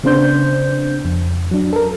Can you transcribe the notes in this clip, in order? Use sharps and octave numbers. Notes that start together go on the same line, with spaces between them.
C#3 B3 C4 D4 C5 G6
F2
F#3 D4
A4 A#4